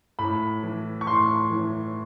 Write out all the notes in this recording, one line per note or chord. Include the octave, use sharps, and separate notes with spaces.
A2 B5
E3
C#6
A2 C6
E3